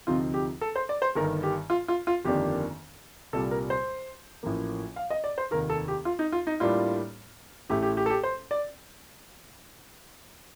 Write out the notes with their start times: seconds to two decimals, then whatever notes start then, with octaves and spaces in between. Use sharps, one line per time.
0.07 D2 C3 F3 C4 D#4 F4
0.34 G4
0.61 A4
0.76 C5
0.89 D5
1.02 C5
1.15 G1 G2 D#3 A#4
1.43 G4
1.70 F4
1.88 F4
2.07 F4
2.25 G1 F2 D#3 A#3 D4 G4
3.33 C2 A#2 G3 A4
3.51 A#4
3.70 C5
4.43 A1 A2 F3 A#3
4.96 F5
5.10 D#5
5.24 D5
5.38 C5
5.51 F1 D#2 D#3 A#4
5.70 A4
5.88 G4
6.05 F4
6.19 D#4
6.32 F4
6.47 D#4
6.60 A2 G3 A#3 D4 F4
7.69 A1 A2 A3 G4
7.82 G4
7.97 G4
8.06 A4
8.10 G4
8.24 C5
8.51 D5